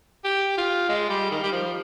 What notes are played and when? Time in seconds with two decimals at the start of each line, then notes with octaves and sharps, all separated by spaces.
0.25 G4
0.57 F4
0.89 G#3
1.10 G3
1.31 D#3
1.43 G3
1.52 F3